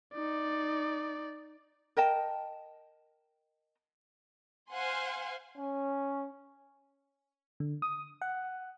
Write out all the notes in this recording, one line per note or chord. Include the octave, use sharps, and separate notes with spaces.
D#4 D5
A#4 D#5 G5 A5
C5 F5 F#5 G#5 C6
C#4
D3
D#6
F#5